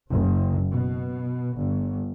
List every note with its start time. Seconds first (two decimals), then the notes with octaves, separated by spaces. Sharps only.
0.11 F#1
0.71 B2
1.56 G1